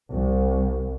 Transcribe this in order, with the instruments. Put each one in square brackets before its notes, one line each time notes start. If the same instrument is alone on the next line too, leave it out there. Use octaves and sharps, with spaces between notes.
[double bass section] C2